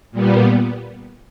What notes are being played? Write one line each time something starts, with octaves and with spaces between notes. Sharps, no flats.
A#2 G3 B3